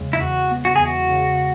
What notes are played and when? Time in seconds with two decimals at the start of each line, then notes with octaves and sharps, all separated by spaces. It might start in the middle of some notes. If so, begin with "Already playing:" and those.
Already playing: E2 C#3 G#3
0.13 E4
0.21 E2 F#4
0.50 B3
0.65 F#4
0.76 E2 G#4
0.85 F#4
1.08 C#3